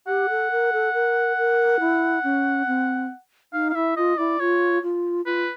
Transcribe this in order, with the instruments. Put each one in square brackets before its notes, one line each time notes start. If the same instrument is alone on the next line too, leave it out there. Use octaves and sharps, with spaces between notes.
[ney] G4 [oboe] F#5
[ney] A4
A#4
A4
A#4
A#4
E4
C#4
C4
[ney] D#4 [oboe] F5
[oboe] F5
[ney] E4 [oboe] E5
[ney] F4 [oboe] D#5
[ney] E4 [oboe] D5
[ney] F4 [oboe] C#5
[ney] F4
[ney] F4 [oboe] B4